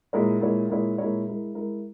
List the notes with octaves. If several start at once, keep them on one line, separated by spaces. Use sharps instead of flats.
A#2 G#3 E4 A#4 C#5
A#2 G#3 E4 A#4 C#5
A#2 G#3 E4 A#4 C#5
A#2 G#3 E4 A#4 C#5
G#3 E4 A#4
G#3 E4 A#4